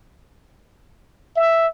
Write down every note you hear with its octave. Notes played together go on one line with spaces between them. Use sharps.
E5